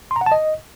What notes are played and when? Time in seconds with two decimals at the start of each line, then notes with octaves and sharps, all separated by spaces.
0.11 C6
0.16 A#5
0.21 F#5
0.26 A5
0.32 D#5